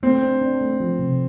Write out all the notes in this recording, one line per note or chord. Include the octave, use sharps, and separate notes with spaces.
A3 C4
D4
D4
A3
F3
C3